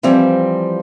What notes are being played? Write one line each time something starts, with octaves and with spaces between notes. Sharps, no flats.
E3 F3 G3 C4